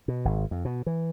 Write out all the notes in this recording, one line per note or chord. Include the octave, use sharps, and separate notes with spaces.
B2
G#1
F2
B2
E3